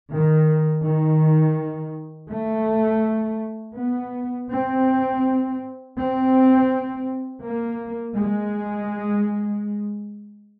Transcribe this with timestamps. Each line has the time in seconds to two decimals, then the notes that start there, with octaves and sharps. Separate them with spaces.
0.10 D#3
0.84 D#3
2.31 A3
3.77 B3
4.50 C4
5.97 C4
7.43 A#3
8.17 G#3